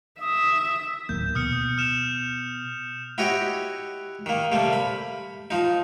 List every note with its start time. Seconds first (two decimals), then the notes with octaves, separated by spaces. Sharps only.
0.21 E5 D#6
1.09 D1 D#2 A#3 G6
1.35 B2 D#6 F6 C#7
1.78 F6 E7 F7
3.18 E4 F#4 G4 C#5 D#5
4.26 D#3 A#3
4.52 C3 G3 A3 A#3
4.73 B5
5.51 F3 D#4